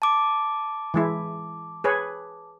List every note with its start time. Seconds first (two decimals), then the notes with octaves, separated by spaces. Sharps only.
0.02 A5 D6
0.94 E3 G#3 E4
1.84 G#4 B4 C#5